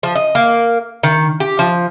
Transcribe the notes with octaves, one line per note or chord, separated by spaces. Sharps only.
F3
D#5
A#3
D#3
G4
F3